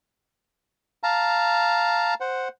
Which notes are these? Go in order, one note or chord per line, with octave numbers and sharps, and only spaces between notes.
F5 A5 A#5
C5 F#5